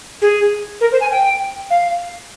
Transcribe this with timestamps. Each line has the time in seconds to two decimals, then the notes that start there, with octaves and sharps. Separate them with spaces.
0.22 G#4
0.81 A#4
0.92 C5
1.01 G#5
1.11 G5
1.70 F5